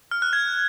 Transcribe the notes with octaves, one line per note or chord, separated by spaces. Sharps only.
F6
F#6
G#6